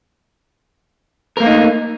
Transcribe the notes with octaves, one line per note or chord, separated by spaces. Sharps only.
A3 A#3 D#4 A#4